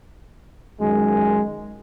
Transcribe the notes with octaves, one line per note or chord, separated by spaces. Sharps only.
F#2 D#3 G#3